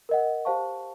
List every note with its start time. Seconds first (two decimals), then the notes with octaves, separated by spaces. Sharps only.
0.09 A#4 D#5 F#5
0.45 G4 C5 F5 A5 C#6